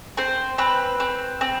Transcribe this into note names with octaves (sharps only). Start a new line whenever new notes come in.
C4 C5
C4 B4
C4
C4